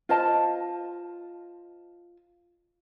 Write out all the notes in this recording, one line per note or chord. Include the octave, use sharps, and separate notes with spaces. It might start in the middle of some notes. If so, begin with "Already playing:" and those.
F4 C5 D#5 A5